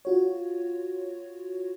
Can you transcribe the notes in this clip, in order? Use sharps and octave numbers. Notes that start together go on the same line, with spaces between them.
F4 F#4 C#5